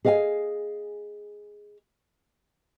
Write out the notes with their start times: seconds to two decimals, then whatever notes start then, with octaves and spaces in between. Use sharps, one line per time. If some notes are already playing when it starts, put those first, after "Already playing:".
0.05 G#4 D#5 F5 F#5 G#5